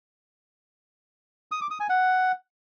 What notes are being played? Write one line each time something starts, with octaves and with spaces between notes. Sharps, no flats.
D#6
D6
D#6
G#5
F#5